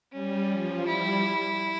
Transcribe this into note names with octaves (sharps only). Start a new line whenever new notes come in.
G3 C#4
F3
G3 E4